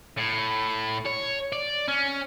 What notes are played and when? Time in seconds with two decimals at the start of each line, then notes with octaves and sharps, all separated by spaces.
0.17 A2
1.06 C#5
1.52 D5
1.88 C#4